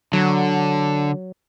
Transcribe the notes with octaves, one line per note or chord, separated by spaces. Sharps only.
D3 F#3